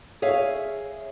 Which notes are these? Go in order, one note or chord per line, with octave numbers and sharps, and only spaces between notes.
G#4 C#5 E5 F5